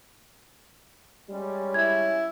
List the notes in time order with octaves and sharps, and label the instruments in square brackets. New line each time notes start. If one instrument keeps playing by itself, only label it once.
[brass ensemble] G3 G#3 C#4
[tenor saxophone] E4 [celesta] G#6